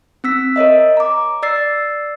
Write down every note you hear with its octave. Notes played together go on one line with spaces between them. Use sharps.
C4 E6 B6
A#4 C#5 D#5 E5
A#5 D6
D5 E6 A6 C7